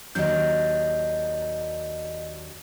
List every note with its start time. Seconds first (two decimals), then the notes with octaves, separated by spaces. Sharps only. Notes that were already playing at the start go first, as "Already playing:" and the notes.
0.15 D#2 F#3 D4 D#5 G6